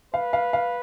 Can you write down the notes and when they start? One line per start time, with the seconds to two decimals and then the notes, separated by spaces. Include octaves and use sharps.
0.14 B4 F5
0.33 F5
0.53 F5